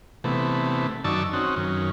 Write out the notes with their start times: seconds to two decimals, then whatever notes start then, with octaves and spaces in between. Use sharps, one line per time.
0.24 C3 E3 A3 B3
1.04 F#2 D#3 D5 A5 C#6 E6
1.33 C4 C#4 D#4 F#4
1.56 F#2 D#3 C#4